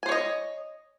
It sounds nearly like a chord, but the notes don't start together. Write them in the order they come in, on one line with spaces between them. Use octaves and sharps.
G#5 C5 C#5 D#5